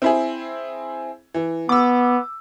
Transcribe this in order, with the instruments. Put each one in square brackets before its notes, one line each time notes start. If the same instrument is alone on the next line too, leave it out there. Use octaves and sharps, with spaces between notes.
[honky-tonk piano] C4 E4 G#4
E3
[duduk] B3 [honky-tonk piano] D6 E6